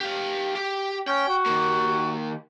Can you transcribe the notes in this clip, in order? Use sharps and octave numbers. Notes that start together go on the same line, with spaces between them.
G4 F5
G4
C#4 G5
F#4
D#3 A#3